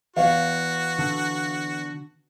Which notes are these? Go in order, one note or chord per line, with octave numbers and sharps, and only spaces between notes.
E2 F#4 F5
D3